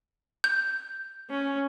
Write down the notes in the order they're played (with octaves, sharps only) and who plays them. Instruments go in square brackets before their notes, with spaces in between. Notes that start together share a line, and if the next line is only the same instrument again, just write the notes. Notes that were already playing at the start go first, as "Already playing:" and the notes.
[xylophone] G6
[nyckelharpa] C#4